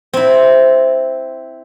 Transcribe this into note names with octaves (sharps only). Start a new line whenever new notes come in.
C4 E4